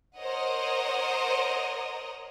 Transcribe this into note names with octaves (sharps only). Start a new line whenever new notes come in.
A#4 C5 C#5 D#5 F#5 D#6